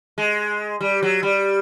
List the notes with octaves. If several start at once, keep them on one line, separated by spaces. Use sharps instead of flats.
G#3
G3
F#3
G3